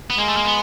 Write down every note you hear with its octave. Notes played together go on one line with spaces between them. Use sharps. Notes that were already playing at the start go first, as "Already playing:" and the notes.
B3
G#3 A#3
A3
A#3
B3